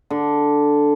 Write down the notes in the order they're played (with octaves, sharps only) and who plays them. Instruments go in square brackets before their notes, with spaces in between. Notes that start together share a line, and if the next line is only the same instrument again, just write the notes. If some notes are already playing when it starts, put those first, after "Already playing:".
[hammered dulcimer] D3